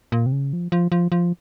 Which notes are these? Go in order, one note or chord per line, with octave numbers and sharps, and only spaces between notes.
A#2
C3
C#3
F3
F3
F3
F3